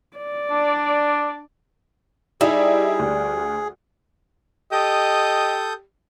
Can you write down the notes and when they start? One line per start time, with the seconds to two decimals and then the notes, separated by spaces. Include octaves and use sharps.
0.17 D5
0.50 D4
2.41 G3 D#4 E4 G4 G#4
2.99 D2
4.72 G4 A4 D#5 D#6 G6